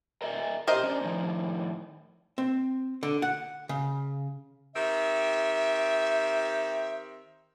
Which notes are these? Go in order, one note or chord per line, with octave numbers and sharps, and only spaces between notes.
A#4 D#5 E5
G4 A#4 C5 D#5 E5
C#4 D4
A2 D#3 F3
C4
D3
F#5
C#3
D#3 C4 G4 E5